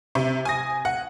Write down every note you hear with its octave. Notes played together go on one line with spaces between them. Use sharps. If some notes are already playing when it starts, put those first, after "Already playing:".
C3
G#5 D#6 A#6
F#5